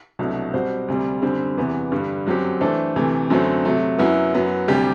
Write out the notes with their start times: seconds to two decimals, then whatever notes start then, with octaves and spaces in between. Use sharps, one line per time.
0.19 C2 B2 F#3 A3 D4
0.54 B2 G3 C4 F#4 C5
0.88 D2 C3 G3
1.22 F#2 D3 G3 C4
1.57 E2 C3 E3 B3
1.92 G2 D3 G3
2.26 F#2 F#3 C4 G4
2.61 E3 A3 D4 A4 C5
2.96 D2 C3 E3 A3
3.30 F#2 D3 F#3 A3 C4
3.65 C3 F#3 A3
3.99 F#2 F#3 B3 E4
4.34 F#2 F#3 B3
4.68 D2 C3 G3 D4 G4